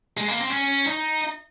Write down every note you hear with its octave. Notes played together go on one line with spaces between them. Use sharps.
G#3
A#3
C4
C#4
D#4